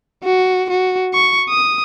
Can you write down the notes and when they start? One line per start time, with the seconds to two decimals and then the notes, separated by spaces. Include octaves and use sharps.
0.24 F#4
0.70 F#4
1.14 C#6
1.49 D#6